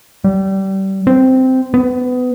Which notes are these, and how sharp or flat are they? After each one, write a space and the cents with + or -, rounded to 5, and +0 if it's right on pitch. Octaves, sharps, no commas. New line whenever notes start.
G3 -25
C4 -10
B3 +25